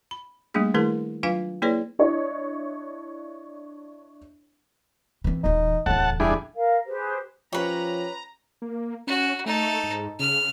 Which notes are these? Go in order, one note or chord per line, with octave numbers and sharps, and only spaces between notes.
B5
G3 A3 A#3 D4 G#4
D#3 A3 E4 G#4 A#4 A5
F#3 D4 F4 B4 F5 G#5
A#3 E4 G#4 B4 C#5 D5
D4 E4 C#5 D#5
E3 C4
D#1 E3 D#4
D1 E2 A2 F#5 A5
G3 D4 E4 G#4
A#4 F5
G4 G#4 B4 C5
F3 C#4 G4 B4 C#5 G5 A#5
A#3
C#4 F#4
A3 D#4 A4
G#2
C#3 F6